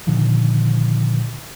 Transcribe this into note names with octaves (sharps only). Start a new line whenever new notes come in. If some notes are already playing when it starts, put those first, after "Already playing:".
A#2 D3 D#3 F3